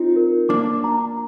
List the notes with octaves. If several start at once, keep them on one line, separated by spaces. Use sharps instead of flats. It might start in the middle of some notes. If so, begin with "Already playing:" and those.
Already playing: C4 D#4 F4
A#4
A#3 D4 D6
A#5